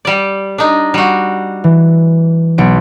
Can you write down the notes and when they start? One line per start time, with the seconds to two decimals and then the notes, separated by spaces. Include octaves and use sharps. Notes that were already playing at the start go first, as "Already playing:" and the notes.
0.05 G3 D5
0.58 D4 D#4
0.94 G3 F#4
1.64 E3
2.58 B1 C#7 D7